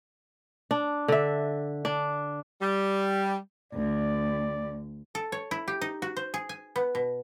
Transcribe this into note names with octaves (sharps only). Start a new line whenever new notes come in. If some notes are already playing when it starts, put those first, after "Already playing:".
D4
D3 E5
D4
G3
D2 D5
A4
C#5
E4
G4
D#4
F#4
C5
G#4
G#5
B3
B2